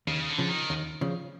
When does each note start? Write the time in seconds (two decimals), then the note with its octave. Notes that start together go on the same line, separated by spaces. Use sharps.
0.07 D#2 C#3
0.28 D3
0.38 C#3 F3
0.50 D#3
0.70 D#2
1.01 C#3 F3